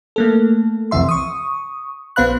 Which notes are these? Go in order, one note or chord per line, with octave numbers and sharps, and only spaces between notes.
A3 A#3 A4
B1 F2 C3 E3 E5 C6
C#6 D#6
A#1 B3 C5 F5 B5 F#6